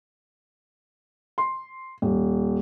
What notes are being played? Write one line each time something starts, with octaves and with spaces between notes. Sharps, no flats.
C6
D#1